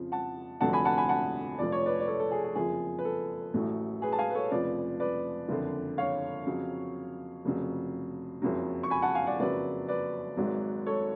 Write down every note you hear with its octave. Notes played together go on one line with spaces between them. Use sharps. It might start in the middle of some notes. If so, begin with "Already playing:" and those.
Already playing: F2 C#3 F3
F#5 A5
F1 F2 D3 F#3 F#5 A5
G#5 B5
F#5 A5
G#5 B5
F#5 A5
F1 F2 F3 D5
C#5
B4 D5
D5
A4 C#5
A4
G#4
G#4
F#1 F2 F3 G#4
B4
A4
A1 A2 F#3
G#4 B4
A5
F5 G#5
B4
A4 C#5
F1 F2 C#3 F3 B4 D5
B4 D5
F#1 F2 D3
C#5 F5
F2 C#3 F#3
F1 F2 C#3 F#3
F#1 F2 C#3 F#3
C#6
G#5 B5
F#5 A5
F5 G#5
D5 F#5
F#1 F2 C#3 F#3 B4 D5
B4 D5
G#1 G#2 F#3
A4 C#5